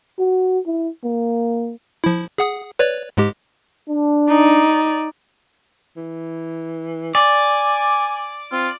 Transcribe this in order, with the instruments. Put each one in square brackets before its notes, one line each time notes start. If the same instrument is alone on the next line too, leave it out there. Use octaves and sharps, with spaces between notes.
[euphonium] F#4
E4
A#3
[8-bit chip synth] F3 E4
G#4 F#5 D#6
B4 C#5 D5
G#2 G#3 G4
[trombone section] D4
[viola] D#4 D5
[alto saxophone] E3
[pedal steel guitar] D5 [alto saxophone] G#5 [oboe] D6
[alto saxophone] C4 [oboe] F4